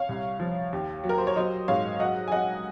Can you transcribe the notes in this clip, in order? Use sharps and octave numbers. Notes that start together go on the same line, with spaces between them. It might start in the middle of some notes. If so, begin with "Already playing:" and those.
Already playing: C#5 F5
C2
F3
D#2
F#3
A#4
C5
C#5
F#3 C5 D#5
G#2 C#5 F5
F#3 D#5 F#5
G#5
F#3 D#5 F#5